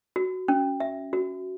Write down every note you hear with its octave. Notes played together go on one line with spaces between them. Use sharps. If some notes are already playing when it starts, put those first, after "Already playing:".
F#4
C#4
E5
F#4